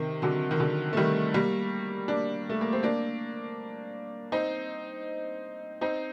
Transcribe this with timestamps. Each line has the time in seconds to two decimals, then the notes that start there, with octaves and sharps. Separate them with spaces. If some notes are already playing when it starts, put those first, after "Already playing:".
Already playing: C3 D#3
0.22 D3 F#3
0.51 D#3
0.59 D3 F#3
0.93 A3
0.97 D#3 G3
1.34 G3 A#3
2.08 A#3 D4
2.49 A3
2.61 A#3
2.72 C4
2.83 A#3 D4
4.32 C4 D#4
5.81 C4 D#4